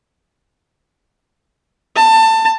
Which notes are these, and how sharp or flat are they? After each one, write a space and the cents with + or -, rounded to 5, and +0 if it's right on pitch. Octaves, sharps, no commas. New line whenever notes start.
A5 +20